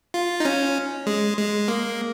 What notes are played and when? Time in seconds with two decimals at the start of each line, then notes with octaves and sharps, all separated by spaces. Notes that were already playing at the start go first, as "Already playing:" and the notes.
0.14 F4
0.40 D#4
0.45 C#4
1.06 G#3
1.37 G#3
1.68 A#3